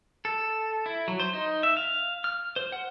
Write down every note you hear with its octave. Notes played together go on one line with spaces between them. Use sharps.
A4
E4
F#3
C5
D#4
E5
F5
F6
C5
F#5